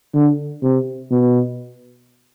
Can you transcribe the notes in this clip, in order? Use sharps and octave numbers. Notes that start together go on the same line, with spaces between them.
D3
C3
B2